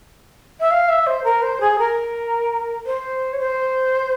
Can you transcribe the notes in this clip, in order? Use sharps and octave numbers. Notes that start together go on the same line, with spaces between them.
E5
F5
E5
C5
A#4
C5
G#4
A#4
C5
C#5
C5